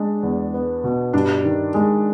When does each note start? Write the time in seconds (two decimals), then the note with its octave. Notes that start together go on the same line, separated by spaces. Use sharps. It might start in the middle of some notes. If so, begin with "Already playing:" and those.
Already playing: G#3 D4
0.23 E2
0.54 B3
0.84 B2
1.13 G2 D4
1.44 D#3
1.74 G#3